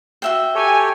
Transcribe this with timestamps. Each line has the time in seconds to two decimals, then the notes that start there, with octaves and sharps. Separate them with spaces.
0.22 F#4 E5 G5
0.55 G4 A4 C#5 G#5